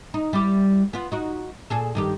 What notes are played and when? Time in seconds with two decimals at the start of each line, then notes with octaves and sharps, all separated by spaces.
0.14 D#4
0.33 G3 E4 G4
0.93 B3 F4
1.12 D#4 F#4
1.70 A#2 G#4 A4
1.95 G2 D#3 G4